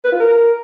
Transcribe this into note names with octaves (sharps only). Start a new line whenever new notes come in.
B4
F4
A#4